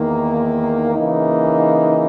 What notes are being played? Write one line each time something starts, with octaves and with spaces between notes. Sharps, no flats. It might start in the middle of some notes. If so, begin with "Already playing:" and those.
Already playing: E2 D#3 A#3
C#3 E3 A#3 D#4